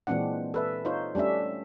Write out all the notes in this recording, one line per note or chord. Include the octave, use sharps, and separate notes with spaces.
A#2 E3 G#3 C4 D4 F#5
A4 B4 E5
D#4 F4 C5 C#5
G3 A3 C#4 D4 E5